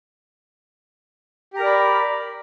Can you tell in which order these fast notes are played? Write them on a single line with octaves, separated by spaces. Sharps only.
G4 A#5 A#4 D5 B5